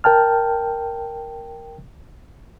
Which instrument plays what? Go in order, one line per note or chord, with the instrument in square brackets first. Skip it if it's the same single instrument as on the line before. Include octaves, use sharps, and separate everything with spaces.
[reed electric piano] A#4 G5 A5 F6